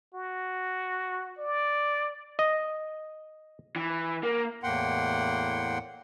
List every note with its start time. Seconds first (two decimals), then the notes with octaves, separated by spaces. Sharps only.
0.15 F#4
1.38 D5
2.39 D#5
3.76 E3
4.23 A#3
4.63 E2 A2 A#3 F#5 G5 C6